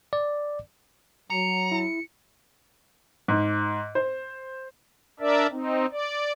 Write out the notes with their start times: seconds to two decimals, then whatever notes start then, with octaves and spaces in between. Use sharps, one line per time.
0.13 D5
1.30 F#3 A#5 C#7
1.72 E4
3.28 G#2
3.95 C5
5.20 D4 A#4 D5 E5
5.51 C4 D#4
5.91 D5